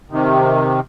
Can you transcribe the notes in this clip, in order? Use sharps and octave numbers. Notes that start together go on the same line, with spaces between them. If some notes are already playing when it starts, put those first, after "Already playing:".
C3 D#3